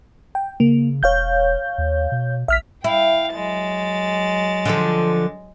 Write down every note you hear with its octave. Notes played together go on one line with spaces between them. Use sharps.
G5
C#3 A#3
E1 C#5 F5 G6
D#2
B2
A#1 E5 F6 B6
E4 F5 G5
F#3 G#3 A6
D3 F3 A4